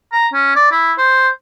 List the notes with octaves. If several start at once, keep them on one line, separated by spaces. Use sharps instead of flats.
A#5
C#4
D5
E4
C5